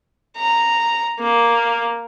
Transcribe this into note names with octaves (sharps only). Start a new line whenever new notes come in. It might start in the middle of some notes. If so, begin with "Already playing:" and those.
A#5
A#3